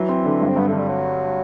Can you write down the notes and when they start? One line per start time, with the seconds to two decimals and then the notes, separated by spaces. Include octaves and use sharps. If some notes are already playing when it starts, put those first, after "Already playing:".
Already playing: E3 F#3
0.09 C4
0.25 D3
0.41 G2
0.49 C4
0.56 G2 B3
0.68 D3 A3
0.79 G3
0.89 F#3